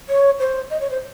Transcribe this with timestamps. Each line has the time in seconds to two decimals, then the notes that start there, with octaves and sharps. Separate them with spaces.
0.09 C#5
0.39 C5
0.70 D#5
0.80 C#5
0.90 C5